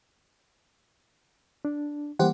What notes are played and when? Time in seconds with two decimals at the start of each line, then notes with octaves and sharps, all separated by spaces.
1.65 D4
2.19 E3 G3 A#3 G4 C5 F#5